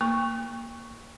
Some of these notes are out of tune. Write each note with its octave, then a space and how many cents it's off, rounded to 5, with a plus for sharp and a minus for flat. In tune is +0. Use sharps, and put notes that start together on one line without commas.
A#3 +0 C#6 +0